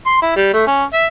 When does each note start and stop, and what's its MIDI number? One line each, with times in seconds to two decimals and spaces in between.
0.06 0.20 84
0.22 0.31 64
0.36 0.50 55
0.53 0.64 57
0.67 0.84 61
0.93 1.05 76